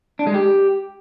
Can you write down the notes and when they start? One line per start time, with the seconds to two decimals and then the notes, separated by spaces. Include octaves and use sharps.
0.19 D4
0.27 G#3
0.34 G4